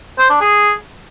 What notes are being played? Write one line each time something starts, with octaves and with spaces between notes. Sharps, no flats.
C5
D4
G#4